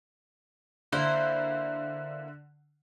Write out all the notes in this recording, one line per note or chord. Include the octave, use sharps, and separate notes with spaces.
D3 A#3 E4 C5